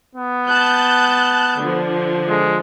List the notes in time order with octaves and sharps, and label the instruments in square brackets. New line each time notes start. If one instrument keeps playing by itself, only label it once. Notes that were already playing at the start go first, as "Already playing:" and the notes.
[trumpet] B3
[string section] A5 F#6 G6
D3 F3
[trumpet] G#3